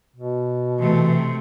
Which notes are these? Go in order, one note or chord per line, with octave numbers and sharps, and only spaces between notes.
B2
C3 E3 A3